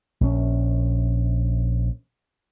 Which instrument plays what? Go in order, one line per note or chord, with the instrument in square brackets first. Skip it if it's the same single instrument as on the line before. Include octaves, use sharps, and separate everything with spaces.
[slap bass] A#1 C#3 C#4